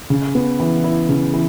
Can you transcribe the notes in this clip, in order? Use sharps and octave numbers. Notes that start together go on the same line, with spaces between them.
C#3
B3
E3
E4
C#3
E3